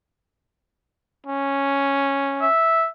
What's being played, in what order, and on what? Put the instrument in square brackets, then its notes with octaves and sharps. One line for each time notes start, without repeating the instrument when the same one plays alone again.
[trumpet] C#4
[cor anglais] E5